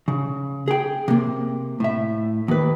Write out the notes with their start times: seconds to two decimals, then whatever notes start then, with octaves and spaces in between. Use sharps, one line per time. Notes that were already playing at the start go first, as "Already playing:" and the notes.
0.08 C#3
0.68 G#4 G5
1.08 C3 A#3
1.80 A2 E5
2.48 D#2 B4